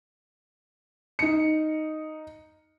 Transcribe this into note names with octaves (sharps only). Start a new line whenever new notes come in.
D#4 C#7